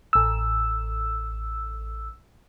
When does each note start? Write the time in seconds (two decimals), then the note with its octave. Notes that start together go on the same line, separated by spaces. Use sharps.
0.13 A1 E6